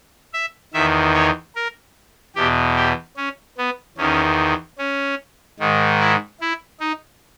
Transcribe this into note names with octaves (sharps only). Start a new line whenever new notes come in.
E5
E2 D#3 E5
C#5
A#4
E2 B2 G4
G4
C#4
B3
E2 D#3 C#4
C#4
G#2 D#3
E4
E4
D#4